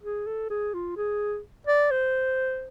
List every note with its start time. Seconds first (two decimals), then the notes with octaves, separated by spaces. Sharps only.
0.03 G#4
0.27 A4
0.50 G#4
0.74 F4
0.97 G#4
1.67 D5
1.91 C5